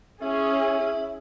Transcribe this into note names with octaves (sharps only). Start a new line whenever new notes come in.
C#4 E4 G#4